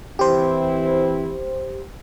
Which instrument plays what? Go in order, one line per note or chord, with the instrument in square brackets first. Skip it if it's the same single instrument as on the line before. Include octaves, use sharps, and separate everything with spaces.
[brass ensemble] E3 C4 E4 [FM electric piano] G4 C5